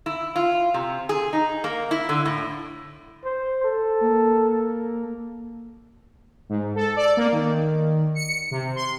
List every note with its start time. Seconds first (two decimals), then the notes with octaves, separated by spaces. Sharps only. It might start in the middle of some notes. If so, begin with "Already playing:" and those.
0.06 E4
0.36 F4
0.74 C3
1.09 G#4
1.33 D#4
1.64 A#3
1.91 E4
2.09 D3
2.25 A2
3.24 C5
3.64 A4
4.01 A#3
6.49 G#2
6.76 A4
6.96 D5
7.17 A#3
7.32 D#3
8.15 C#7
8.51 C3
8.76 C6